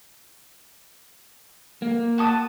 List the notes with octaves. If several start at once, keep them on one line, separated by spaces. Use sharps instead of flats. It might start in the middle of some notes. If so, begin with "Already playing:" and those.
A#3
F#4 A5 D#6